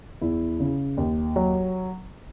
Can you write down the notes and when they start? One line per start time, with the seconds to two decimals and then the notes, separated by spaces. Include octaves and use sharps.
0.21 E2 E4
0.60 C#3
0.97 D#2
1.36 F#3